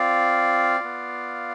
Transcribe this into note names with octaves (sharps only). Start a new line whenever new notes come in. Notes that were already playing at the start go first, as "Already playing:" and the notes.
Already playing: C4 F4 D5 F5
B3 F4